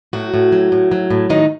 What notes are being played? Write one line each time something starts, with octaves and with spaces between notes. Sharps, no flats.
A2 F#3 F#4
A2
F#3
A2
F#3
A2
A2 D#3 D#4